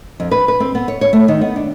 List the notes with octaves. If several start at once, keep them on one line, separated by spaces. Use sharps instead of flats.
F2
B4
B4
C4
B3
C#5
C#5
A3
D#3
B3
D4